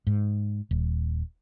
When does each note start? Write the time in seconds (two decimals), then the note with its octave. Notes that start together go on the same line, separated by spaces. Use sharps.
0.07 G#2
0.71 D#1